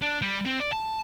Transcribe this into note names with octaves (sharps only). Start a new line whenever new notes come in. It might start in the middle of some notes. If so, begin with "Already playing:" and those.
D4
G3
C4
D5
A5